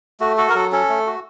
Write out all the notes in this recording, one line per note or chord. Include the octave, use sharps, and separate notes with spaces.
A3 F#4
F#4 A4
A#4
F#3 A4
C#4 A4
A3
F#4